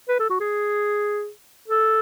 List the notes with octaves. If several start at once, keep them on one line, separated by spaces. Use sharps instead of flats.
B4
A4
F#4
G#4
A4